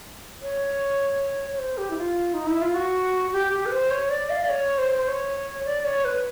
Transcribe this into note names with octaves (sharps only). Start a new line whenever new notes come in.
C#5
C#5
C5
G4
E4
F4
D#4
E4
F4
F#4
G4
G4
B4
C5
C#5
D5
F5
D5
C#5
C5
C5
C#5
D5
C#5
B4